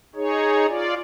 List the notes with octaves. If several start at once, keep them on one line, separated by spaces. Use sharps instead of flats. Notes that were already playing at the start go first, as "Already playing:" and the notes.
D#4 G#4 C#5
F4 D5